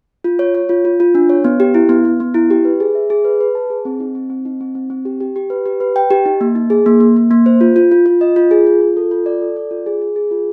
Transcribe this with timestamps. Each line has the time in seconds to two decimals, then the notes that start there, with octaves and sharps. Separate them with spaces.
0.24 F4
0.39 C#5
0.54 C#5
0.69 F4
0.85 F4
1.00 F4
1.15 D4
1.29 C#5
1.44 B3
1.60 G4
1.74 E4
1.89 B3
2.05 B3
2.20 B3
2.34 E4
2.50 G4
2.65 B4
2.80 G#4
2.95 E5
3.10 G#4
3.25 B4
3.41 B4
3.55 A5
3.70 G#4
3.85 C4
4.00 D#4
4.15 C4
4.30 C4
4.45 D#4
4.61 C4
4.75 C4
4.90 C4
5.05 G4
5.21 G4
5.36 G4
5.50 B4
5.66 G4
5.80 B4
5.96 G5
6.11 G4
6.26 D#4
6.41 A#3
6.55 D#4
6.70 G#4
6.86 A#3
7.00 A#3
7.16 A#3
7.31 A#3
7.46 C5
7.61 F4
7.76 F4
7.92 F4
8.06 F4
8.21 D#5
8.36 F4
8.51 G#4
8.67 F4
8.81 F4
8.97 A4
9.11 F4
9.26 D5
9.41 A4
9.57 D5
9.71 F4
9.86 G#4
10.01 G#4
10.16 G#4
10.31 F4